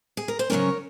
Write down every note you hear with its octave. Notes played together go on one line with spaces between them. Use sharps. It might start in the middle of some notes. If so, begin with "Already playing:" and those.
G#4
A#4
C5
C#3 F#3 A#3 C#4 A#4 C#5